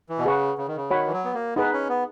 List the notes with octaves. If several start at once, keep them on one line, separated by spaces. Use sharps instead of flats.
E3
B2
C#3 G#4 B4 F#5 C#6
C#3
D#3
C#3
D#3 F#4 C#5 F#5 B5
E3
F#3
B3
A#3
B3 D#4 G#4 B4
C#4
B3